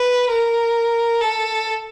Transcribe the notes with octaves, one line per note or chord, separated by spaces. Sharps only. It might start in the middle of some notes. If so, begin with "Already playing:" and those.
Already playing: B4
A#4
A4